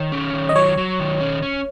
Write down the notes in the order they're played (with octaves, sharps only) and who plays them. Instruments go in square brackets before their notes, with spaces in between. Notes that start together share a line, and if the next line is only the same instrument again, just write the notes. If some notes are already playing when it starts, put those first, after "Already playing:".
Already playing: [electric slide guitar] D#3 [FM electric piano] C#5
[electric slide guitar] C#4
D#3
[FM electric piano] D#5
[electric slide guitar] F#3 [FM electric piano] C#5
[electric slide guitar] F#3
D#3
C#4
C#4